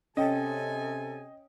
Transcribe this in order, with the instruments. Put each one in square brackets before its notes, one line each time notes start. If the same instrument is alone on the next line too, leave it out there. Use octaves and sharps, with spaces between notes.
[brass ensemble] C3 G#5 [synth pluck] C#4 [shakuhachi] A4 [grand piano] D#5 G5